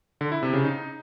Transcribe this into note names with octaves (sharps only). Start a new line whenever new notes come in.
D3
E4
C3
C#3
D#4